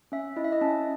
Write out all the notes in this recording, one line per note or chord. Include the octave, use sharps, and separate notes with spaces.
C#4 E5
E4 D#5
E5
D#5
C#4 A5